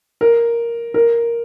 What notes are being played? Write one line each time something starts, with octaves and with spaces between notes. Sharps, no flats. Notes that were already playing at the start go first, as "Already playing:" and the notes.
A#4
A#4